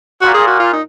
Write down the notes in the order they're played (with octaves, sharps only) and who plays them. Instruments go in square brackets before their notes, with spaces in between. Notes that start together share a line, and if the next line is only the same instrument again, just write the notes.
[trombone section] A#2 [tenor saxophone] F#4
[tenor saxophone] G#4
F#4
F4
D#4